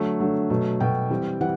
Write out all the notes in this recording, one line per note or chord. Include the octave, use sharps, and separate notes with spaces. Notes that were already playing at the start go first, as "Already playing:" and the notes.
Already playing: D3 F#3 A3
D3 F#3 A3
B2 F#3 A3
B2 F#3 A3 G5
E3 G3 C4
E3 G3 F#5